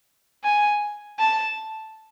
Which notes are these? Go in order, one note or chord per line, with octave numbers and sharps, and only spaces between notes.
G#5
A5